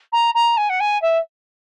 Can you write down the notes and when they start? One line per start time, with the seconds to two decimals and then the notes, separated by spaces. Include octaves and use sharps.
0.12 A#5
0.34 A#5
0.57 G#5
0.69 F#5
0.80 G#5
1.02 E5